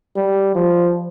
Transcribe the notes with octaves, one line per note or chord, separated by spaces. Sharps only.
G3
F3